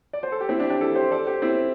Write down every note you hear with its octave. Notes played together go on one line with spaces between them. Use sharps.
D5
C5
A4
G4
C4 E4
D4 G4
D4 G4
E4 A4
G4 C5
A4 D5
G4 C5
C4 E4